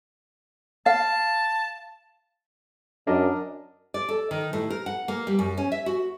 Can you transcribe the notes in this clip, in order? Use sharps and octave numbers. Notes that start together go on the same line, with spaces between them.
F5 A5
F#2 D4 A#4 D#5
D5
A4
D#3
A2
A#4
F#5
A#3
G3
F#2
C#4
E5
F#4